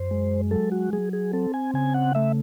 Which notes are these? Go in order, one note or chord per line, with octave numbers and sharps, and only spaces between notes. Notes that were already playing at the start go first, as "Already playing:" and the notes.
Already playing: F#2 C5
G#3
F#3 A4
F#4
F#3 G#4
G#4
C4 A4
G#5
C#3 G#5
F#5
A3 E5